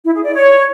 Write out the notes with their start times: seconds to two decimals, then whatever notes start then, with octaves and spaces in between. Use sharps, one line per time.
0.04 E4
0.14 G#4
0.24 D5
0.34 C#5